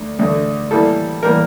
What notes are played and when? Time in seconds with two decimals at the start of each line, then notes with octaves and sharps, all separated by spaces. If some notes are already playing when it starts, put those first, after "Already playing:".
Already playing: D2 D3
0.19 D2 D3 A3
0.71 A2 E3 G3 A#3 A4
1.23 A2 E3 G3 A#3 A#4